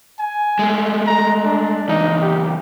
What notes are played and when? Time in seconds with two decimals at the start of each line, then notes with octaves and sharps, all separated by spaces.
0.19 G#5
0.59 G#3 A3
1.07 A#5
1.44 D4
1.88 C#2 E3 D#4
2.21 G4